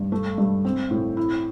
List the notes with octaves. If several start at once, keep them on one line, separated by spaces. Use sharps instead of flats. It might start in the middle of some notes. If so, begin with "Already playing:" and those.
Already playing: G2
A3
G2
C4
A2
E4